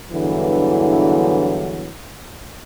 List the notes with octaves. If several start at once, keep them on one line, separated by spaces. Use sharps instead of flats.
E2 G2 D3 E3 F#3